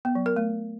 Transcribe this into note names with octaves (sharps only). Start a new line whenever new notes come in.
B3
F#3
A#4
A3